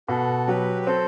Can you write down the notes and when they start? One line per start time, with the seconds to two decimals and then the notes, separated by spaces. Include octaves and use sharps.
0.08 B2 F#4 A4
0.47 F#3 G4 B4
0.82 B4
0.87 C4 A4 C5